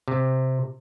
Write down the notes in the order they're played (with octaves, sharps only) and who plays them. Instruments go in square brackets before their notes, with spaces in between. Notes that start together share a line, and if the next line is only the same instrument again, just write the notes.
[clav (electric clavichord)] C3